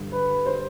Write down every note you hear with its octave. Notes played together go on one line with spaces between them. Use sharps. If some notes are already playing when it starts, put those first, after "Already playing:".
Already playing: G2 D3 G3
B4
C5